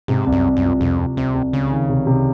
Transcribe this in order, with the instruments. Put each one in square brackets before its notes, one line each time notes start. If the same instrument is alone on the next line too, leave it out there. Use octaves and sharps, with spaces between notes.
[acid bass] G#2 [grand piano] C3
[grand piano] C2
[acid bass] F#2
[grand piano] C2
[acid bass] F#2
[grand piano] F3
[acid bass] F2 [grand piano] C3
[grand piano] C2
[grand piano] C2 [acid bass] C3
[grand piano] C2
[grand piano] C#2 [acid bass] C#3
[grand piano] D#3
C3
C3